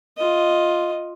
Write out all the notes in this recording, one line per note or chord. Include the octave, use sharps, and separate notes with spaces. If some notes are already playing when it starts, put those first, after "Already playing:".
F4 D#5